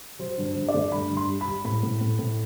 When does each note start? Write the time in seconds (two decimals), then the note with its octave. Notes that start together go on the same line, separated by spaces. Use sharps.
0.19 F#3 C5
0.38 G2
0.44 C5
0.56 G2
0.69 D5
0.74 A3
0.92 G2 B5
1.11 G2
1.17 C6
1.28 G3
1.41 B5
1.47 G3
1.65 A2 B5
1.83 A2
2.01 A2
2.19 A2